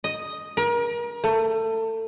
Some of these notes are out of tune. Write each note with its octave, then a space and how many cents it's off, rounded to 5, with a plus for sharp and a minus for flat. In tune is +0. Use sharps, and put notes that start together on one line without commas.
D#5 +0
A#4 +35
A3 +25